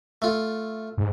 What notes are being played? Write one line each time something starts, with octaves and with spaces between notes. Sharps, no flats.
A3 F4
G#2